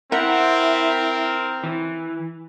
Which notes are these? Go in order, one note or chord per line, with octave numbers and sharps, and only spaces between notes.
C4 E4 A#4 F#5
E3